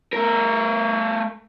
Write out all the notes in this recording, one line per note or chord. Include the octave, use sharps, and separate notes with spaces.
A3 A#4